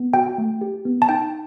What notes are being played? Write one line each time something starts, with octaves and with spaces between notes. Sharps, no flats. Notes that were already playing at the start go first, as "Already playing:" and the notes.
Already playing: B3
F#4 G5
A3
G4
B3
A5
D#4 G5